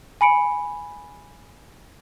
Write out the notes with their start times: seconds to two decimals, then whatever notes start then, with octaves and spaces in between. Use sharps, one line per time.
0.21 G#5 B5 C#7 D7